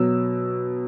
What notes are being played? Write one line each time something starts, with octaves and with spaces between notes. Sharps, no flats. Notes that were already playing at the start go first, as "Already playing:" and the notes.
Already playing: B2 F#3 E6